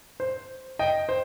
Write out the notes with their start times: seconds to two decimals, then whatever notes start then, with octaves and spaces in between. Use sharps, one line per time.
0.20 C5
0.79 D#5 G5
1.09 C5